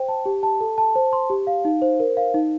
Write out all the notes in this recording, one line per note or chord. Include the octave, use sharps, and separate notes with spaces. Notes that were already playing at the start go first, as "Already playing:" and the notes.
Already playing: C5 G5
A5
G4
A5
A4
A5
C5
C6
G4
F5
D#4
C5
A#4
F5
D#4